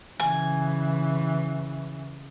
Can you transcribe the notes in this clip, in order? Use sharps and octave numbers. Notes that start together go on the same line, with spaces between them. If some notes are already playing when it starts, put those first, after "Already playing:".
C#3 E3 G#5